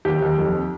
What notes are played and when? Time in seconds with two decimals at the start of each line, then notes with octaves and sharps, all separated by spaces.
0.05 D#2 G4
0.22 D#2
0.38 F2